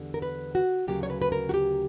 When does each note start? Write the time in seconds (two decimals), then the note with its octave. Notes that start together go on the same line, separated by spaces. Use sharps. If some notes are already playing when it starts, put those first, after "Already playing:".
Already playing: E2 D3 G3 B3
0.14 A#4
0.22 B4
0.55 F#4
0.87 D2 C#3 F#3 A#3 G4
1.03 C#5
1.10 B4
1.22 B4
1.32 A#4
1.49 F#4
1.54 G4